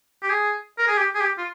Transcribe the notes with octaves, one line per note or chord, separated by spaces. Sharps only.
G4
G#4
A#4
G#4
G4
G#4
G4
F4